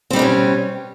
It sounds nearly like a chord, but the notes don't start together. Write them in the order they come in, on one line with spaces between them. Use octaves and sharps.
C4 G3 D#4 B2 C#4